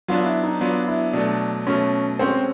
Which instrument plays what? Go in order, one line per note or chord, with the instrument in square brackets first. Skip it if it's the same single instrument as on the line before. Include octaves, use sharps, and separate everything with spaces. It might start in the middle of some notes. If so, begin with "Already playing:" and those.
[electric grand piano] F#3 B3 D4 [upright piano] F4
[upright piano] E4
D#4
[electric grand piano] F#3 B3 D4 [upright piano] F4
[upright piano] E4
[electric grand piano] B2 F#3 A3 [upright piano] D4
[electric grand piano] B2 F#3 A3 [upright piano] C#4
[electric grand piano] G#3 C#4 F#4 A4 [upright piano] C4